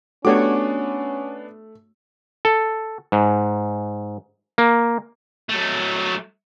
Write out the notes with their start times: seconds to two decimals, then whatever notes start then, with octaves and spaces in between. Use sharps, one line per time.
0.25 A3 B3 C#4 D4 F#4 G4 C#5 D6
2.45 A4
3.12 G#2
4.58 A#3
5.49 F#3 A3